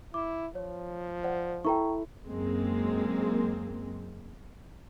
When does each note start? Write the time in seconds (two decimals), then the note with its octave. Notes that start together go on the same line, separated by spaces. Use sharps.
0.14 E4 D6
0.55 F3 C#5
1.23 C5 D5 F#5
1.64 E4 A4 G5 A#5 C#6
2.28 F#2 G#3 A#3 C4